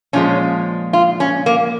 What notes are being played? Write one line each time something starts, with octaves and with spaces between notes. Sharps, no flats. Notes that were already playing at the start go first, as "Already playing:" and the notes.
A#2 F3 G#3 C#4
F4
C#4
A#3